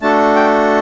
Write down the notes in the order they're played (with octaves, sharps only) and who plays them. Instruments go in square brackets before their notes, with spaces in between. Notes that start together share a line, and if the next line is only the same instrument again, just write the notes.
[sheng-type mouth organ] A3 D4 F#4 A4 A5
G5